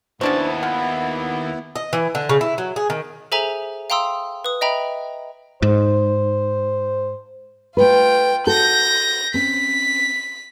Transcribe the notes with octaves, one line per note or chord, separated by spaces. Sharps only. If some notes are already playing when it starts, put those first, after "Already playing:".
D#2 B3 C#4 D4 E4 F#4 C5 A5
F3 F#5 B5
D#5
E3
D3
C#3
E4
F#3
G#4
D#3
G#4 A4 C5 E5 G#5 A#5
F5 G5 A#5 C6 D#6 E6
B4 D#6
D#5 E5 G5 A#5 B5
G#2 C5
A3 F4 B4 G5
F#4 A4 G6 A#6
C4 C#4 B6